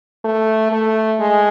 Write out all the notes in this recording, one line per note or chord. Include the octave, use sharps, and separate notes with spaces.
A3
A3
G#3